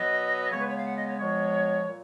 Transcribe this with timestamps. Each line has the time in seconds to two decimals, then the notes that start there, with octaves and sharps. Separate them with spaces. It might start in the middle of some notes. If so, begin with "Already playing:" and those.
Already playing: B2 F#3 B3 D#5
0.50 C#3 G#3 B3 C#5
0.60 B4
0.67 C#5
0.77 F5
0.85 F#5
0.96 D#5
1.07 C#5
1.18 A#2 F3 G#3 B3 C#5
1.86 A#2 F#3